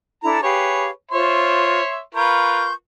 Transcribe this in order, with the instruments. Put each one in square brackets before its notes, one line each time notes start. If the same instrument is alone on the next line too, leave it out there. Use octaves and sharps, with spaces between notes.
[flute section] D4 E4 A4 [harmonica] A#5
[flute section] G4 F5 [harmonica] G#4 B4 C#5
[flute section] F4 C5 [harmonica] C#5 E5 C6
[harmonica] F4 A#4 B4 [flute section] C6 C#6 G6